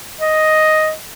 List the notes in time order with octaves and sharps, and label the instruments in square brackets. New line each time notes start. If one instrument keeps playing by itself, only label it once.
[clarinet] D#5